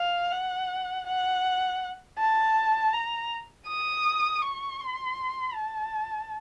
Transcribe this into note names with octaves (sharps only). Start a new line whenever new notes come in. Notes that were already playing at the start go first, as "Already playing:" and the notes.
Already playing: F5
F#5
F#5
A5
A#5
D#6
C#6
C6
A5